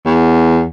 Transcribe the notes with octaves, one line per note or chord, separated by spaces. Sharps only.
E2